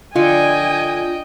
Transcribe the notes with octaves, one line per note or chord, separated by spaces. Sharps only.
D3 F4 D#5 G5 G#5